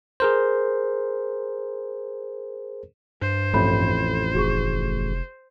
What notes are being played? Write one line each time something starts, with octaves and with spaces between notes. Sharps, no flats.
G#4 A#4 C5
G2 C5
A1 F2 A2 A4 B5 G6
F1 F#4 G#4 C#6